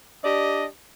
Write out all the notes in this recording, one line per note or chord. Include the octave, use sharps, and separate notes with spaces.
D4 G4 D5 D#5